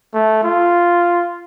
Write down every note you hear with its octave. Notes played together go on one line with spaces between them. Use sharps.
A3
F4